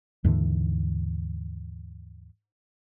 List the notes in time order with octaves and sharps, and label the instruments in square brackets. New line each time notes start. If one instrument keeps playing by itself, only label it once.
[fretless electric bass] D#2 G#2 D3 E3